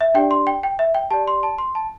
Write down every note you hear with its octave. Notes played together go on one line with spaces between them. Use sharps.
E5
D4 G4 D5 G5
C6
G5
G5
E5
G5
G4 D5 A5
C6
A5
C6
A5